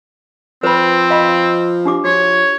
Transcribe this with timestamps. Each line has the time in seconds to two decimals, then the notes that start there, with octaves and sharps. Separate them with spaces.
0.63 F3 C4 B4 B5
1.10 D#5 F5 B5
1.85 D4 G4 D6
2.05 F3 F#4 C#5